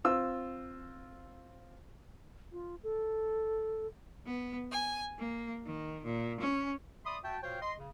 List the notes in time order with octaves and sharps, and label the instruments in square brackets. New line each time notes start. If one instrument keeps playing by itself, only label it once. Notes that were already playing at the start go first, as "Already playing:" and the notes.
[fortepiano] C4 F4 E6
[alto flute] F4
A4
[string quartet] B3
G#5
A#3
D#3
A#2
C#4
[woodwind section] D5 E5 B5 C6 D#6
F#4 E5 G5 A5
A#2 F#4 C5 C#5 F5 G5
D#5 C6
C#3